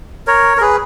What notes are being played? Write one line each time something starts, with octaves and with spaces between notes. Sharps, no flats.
A#4 C#5
A#4
G#4 B4